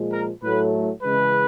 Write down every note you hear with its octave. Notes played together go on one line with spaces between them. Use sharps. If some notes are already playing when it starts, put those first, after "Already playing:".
Already playing: A#2 F3 G#3
A#4
A2 F#3 A3 B4
C#3 E3 G#3 B4